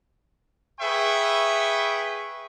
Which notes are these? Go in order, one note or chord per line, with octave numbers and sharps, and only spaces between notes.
G#4 B4 E5 G5 C#6